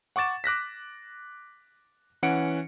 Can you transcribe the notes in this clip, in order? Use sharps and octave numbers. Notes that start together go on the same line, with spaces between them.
F#5 C#6 D6 A6 E7
D6 F#6 A#6 B6
E3 C#4 F#5 C#7 D7